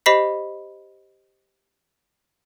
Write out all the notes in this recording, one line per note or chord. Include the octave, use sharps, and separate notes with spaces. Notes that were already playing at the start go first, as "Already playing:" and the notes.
G4 C5 D#5 B5 B6 C7